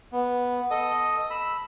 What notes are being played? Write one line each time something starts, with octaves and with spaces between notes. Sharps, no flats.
B3
A4 D#5 D#6
B5 E6